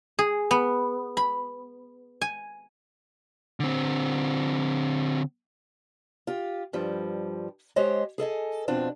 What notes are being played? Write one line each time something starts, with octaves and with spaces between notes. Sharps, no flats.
G#4
B3
B5
G#5
D3 C4
F4 G4
G2 F3 G3
G#3 G4 C5 C#5 D#5
G#4 A4 D#5 G#5
F2 B2 C4 D4 F4